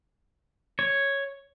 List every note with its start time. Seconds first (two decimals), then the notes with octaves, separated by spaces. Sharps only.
0.79 C#5